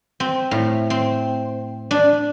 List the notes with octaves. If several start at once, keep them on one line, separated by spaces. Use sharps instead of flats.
C4
A2
C4
D4